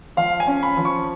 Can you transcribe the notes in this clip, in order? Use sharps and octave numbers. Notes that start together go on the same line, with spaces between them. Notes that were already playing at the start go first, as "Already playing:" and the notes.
F3 F5
G#5
C#4
B5
F3
C#6